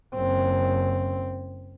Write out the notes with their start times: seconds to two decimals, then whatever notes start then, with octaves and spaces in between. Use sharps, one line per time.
0.15 F#1 C4